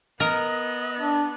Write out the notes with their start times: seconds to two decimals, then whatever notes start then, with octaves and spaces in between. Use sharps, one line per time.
0.20 B3 A#4 D#5
1.00 D4